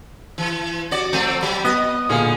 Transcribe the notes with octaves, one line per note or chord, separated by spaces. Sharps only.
E3
F#4 D5
F3 A3 C4
F#3
B3 D#5
A#2 D3 G#4 F5